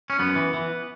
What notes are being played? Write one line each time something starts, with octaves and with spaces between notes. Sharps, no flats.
C#4
F#2 B3
E3
E3